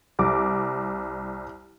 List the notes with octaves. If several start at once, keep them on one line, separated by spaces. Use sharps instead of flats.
C2 D6